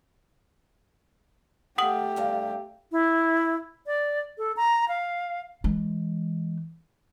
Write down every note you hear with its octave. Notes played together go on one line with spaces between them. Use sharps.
A3 F4 G4 F#5 D#6 F#7
E2 G2 F5
E4
D5
A4
A#5
F5
E3 G#3